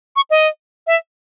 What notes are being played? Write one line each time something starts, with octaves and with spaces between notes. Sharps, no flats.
C#6
D#5
E5